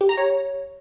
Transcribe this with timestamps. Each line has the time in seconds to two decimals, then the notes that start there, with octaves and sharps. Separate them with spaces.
0.01 G4
0.09 A#5
0.17 C#5